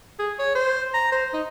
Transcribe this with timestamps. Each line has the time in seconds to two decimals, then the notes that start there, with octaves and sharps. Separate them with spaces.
0.19 G#4
0.39 C#5
0.55 C5
0.94 A#5
1.12 C5
1.34 D#4